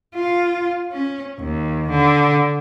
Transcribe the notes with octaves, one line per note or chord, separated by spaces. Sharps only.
F4
C#4
D#2
D3